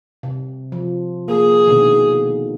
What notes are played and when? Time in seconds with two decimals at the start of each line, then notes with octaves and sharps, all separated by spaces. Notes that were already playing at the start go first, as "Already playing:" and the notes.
0.23 C3
0.72 F3
1.28 A#3 G#4
1.67 B2 D3 D#3